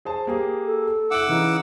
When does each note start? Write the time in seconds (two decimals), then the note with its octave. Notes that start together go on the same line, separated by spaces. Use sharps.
0.05 G#4 C5 A5
0.27 A#3 G4 G#4
0.65 A4
1.11 E4 F#5 D6 E6 F#7
1.28 C#3 E3 D#4